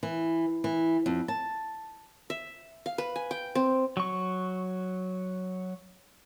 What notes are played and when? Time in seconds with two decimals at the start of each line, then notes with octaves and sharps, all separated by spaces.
0.03 E3
0.64 E3
1.06 F2
1.28 A5
2.30 E5
2.86 F5
2.98 B4
3.16 G#5
3.31 G5
3.55 C4
3.97 F#3 C#6